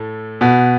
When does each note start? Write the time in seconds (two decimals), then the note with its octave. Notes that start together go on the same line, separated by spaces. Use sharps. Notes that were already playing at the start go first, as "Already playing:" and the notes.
Already playing: A2 A3
0.41 B2 B3